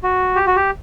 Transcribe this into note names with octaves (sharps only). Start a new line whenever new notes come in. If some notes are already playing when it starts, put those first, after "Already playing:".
F#4
G4
F#4
G4